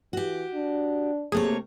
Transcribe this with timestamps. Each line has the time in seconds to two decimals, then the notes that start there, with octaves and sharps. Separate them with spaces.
0.13 E3 F#4 G4
0.54 D4
1.32 C3 A3 A#3 G#4 C#5